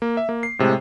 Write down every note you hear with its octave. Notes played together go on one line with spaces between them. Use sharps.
A#3
E5
A#3
C7
A2 C3 G#3